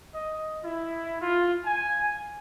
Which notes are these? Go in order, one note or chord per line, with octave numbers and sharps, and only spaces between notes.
D#5
E4
F4
G#5